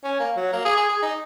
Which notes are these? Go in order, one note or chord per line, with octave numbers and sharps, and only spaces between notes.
C#4
A#3
F#3
A#3
G#4
G#4
G#4
D#4